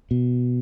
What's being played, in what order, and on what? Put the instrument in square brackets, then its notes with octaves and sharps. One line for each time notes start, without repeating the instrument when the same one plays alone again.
[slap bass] B2